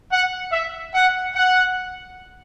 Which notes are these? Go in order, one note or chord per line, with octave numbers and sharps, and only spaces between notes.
F#5
E5
F#5
F#5